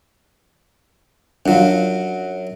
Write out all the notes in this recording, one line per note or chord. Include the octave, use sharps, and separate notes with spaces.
F#2 F#3 D4 F4